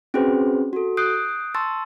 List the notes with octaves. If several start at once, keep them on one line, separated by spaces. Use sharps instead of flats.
C4 C#4 F#4 G#4 B4 C5
F#4 A4
D#6 F#6 G6 C7 D7
A5 C6 C#6 E6 A6